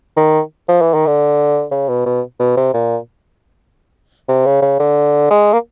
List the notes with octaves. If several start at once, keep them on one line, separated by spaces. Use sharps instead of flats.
D#3
F3
E3
D#3
D3
C#3
B2
B2
B2
C3
A#2
C3
C#3
C#3
D3
G#3
A#3